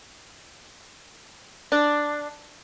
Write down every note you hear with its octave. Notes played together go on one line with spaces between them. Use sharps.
D4